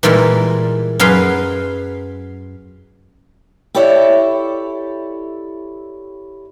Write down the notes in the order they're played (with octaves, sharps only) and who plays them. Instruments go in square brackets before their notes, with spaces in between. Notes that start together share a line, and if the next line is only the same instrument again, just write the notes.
[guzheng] A#2 E3 G3 G#3 A#4
F#2 G#4 B4 F5 C6
[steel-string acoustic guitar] E4 G4 A4 C#5 D5 E5